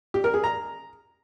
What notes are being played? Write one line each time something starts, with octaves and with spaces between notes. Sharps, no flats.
G4
A#4
G#4
A#5